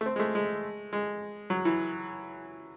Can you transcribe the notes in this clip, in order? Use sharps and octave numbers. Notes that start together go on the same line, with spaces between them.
A3
C4
G#3
A3
G#3
G#3
F#3
E3